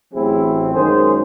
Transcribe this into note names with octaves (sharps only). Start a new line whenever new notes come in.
A1 A2 F#3 C4 E4 G#4
F#2 D#3 G#3 G#4 C5